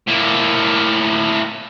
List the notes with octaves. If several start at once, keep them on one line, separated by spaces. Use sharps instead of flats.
A2 A#3